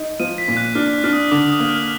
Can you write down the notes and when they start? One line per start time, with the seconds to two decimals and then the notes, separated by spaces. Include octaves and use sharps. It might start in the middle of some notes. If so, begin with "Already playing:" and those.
Already playing: D#4
0.20 F3 D#7
0.38 B6
0.48 A#2
0.57 F#6
0.75 D4 F6
1.04 D4 F6
1.13 D#6
1.31 D3 D6
1.50 D#6
1.60 A#3
1.69 F6